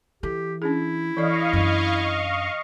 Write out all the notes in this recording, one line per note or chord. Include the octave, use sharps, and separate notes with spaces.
E3 G4 A4
C#4 D4 E4 G#4
E3 A4 D5 D#5 F5 C#6
F#2 D4